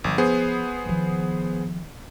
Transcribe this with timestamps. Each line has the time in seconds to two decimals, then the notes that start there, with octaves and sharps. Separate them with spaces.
0.04 G1 F3
0.18 B3 G#4 C5
0.85 D#3 F3